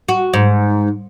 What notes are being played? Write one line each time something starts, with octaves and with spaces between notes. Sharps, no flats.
F#4
G#2